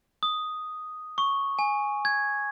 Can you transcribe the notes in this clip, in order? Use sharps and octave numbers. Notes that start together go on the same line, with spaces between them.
D#6
C#6
G#5
G#6